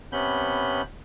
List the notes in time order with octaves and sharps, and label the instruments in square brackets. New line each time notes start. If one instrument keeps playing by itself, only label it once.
[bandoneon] C3 B3 C#4 B5 G6